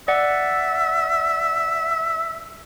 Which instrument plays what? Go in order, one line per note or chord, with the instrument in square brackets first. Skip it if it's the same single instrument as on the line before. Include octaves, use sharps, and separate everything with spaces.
[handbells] D5 F#5 [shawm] E5